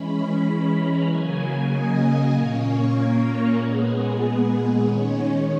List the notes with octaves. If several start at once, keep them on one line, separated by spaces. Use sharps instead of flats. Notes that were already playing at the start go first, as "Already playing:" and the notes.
Already playing: E3 G#3 C#4 B5
A#5
C#3 F#3 A#3 G#5
D#5
A#2 A#3 C#4 C#5
A#4
A#2 G#3 B3 G#4
G#4
D#3 G#3 C#4 C#5